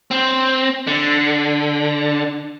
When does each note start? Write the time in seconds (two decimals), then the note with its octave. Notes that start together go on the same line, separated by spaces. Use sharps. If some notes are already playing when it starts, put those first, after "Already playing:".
0.11 C4
0.87 D3